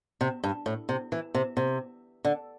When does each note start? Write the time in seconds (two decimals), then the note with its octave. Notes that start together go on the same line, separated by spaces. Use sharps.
0.21 C3
0.44 G2
0.66 A2
0.89 C3
1.12 E3
1.34 C3
1.57 C3
2.24 D3